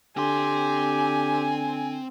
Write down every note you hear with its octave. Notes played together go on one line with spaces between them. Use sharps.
D3 C4 G4 G#5 C6